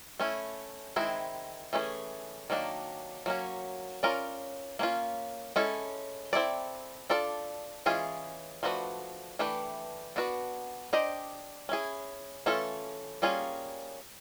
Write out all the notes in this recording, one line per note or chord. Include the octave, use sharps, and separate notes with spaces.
A3 C#4 E4
D#3 G#3 C4 E4
E3 A3 C#4 E4 G#4
D#3 F#3 A#3 D4
F#3 A#3 C#4
C#4 F4 A#4 D5
A#3 C#4 F4
G#3 C#4 E4 A4
C4 E4 A4 D5
D4 F4 A4 D5
E3 G#3 C#4 F4 G#4
F3 A3 D4 F#4 B4
E3 A3 D4 G4 B4
B3 D4 F#4 B4
D4 G4 C5 D#5
C#4 E4 G#4
E3 A3 C#4 F4 A4
G3 A#3 C#4 F4 G#4